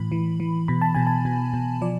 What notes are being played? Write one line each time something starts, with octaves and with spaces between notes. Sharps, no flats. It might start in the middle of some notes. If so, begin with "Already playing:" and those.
Already playing: A2 E3 B5
E3
E3
B2 B5
A5
B2 G#5
A5
B2
B2
F3 D5